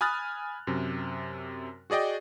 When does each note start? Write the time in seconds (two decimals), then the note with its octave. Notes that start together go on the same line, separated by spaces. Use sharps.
0.01 G#5 B5 D#6 F6 F#6 A6
0.67 F#2 C3
1.90 F#4 G#4 D5 D#5 G5